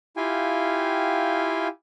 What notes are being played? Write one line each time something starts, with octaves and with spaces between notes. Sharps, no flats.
E4 F4 G4 F5 G5 G#5